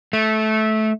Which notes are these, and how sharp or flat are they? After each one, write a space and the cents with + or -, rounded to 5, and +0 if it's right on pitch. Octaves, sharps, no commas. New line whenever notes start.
A3 -15